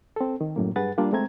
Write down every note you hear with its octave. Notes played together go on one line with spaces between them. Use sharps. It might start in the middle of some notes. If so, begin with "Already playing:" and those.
C4 A4
D#3
F#2 A2 A#3
G2 G#4 B4 F#5 A6
G3 A#3 D4 F4 D5
G#3 A3 C4 A#5 G#6